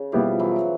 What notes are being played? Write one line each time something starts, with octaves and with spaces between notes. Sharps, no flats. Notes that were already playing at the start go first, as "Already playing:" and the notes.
Already playing: C#3
B2 F3 G3 B3 E4 G4
E3 F#3